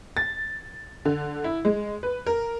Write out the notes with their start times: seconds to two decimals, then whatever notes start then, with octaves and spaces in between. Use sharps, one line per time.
0.17 A6
1.05 D3
1.44 E4
1.65 G#3
2.03 B4
2.26 A#4